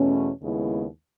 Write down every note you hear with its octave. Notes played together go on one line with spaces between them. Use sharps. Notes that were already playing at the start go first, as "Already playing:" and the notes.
Already playing: E2 B2 A3 C#4
D#2 C#3 G#3 B3 E4